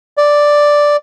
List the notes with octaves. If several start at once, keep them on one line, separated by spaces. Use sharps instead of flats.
D5